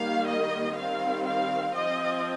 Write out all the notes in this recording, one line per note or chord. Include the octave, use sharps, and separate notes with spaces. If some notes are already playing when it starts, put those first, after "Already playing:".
Already playing: D#3 G3 A#3 F5
D#5
D#3 G3 C4 F5
F5
F3 C4 D#5